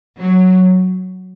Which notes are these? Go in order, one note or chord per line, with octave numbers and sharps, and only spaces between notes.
F#3